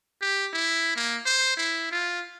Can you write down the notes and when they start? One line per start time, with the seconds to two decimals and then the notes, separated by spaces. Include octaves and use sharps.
0.22 G4
0.53 E4
0.96 A#3
1.26 C5
1.57 E4
1.91 F4